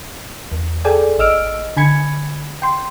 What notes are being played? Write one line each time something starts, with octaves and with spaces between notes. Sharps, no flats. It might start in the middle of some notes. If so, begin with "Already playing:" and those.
E2
G#4 A4 D5 G5 G#5
A1 D#5 E6 F6 D7
D3 G#5 B5 G#6 C#7
G5 C6